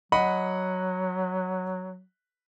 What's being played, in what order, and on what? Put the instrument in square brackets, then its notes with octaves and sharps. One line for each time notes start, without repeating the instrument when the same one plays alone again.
[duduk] F#3 [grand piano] D#5 F#5 B5